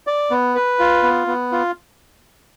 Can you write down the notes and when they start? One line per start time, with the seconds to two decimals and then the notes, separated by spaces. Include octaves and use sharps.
0.07 D5
0.31 B3
0.55 B4
0.79 F4
1.03 B3
1.27 B3
1.52 F4